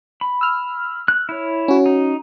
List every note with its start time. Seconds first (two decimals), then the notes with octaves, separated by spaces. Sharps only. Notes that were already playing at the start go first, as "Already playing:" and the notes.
0.21 B5
0.41 E6 F6
1.08 F#6
1.29 E4 C#5
1.68 C#4 F#4
1.86 D#4